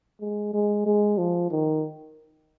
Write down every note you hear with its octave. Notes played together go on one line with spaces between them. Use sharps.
G#3
G#3
G#3
F3
D#3